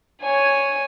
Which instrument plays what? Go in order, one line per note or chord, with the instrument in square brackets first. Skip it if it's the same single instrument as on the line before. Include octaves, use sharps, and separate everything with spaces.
[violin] C#5 G#5